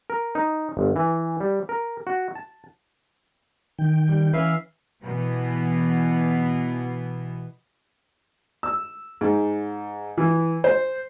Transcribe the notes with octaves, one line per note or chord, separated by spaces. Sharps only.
A#4
D#4
G1
E3
G3
A#4
F#4
A5
D#3 G5
G3
E3 C#4 B4 E5 F5
B2 E3 B3
E6
G#2
E3
C5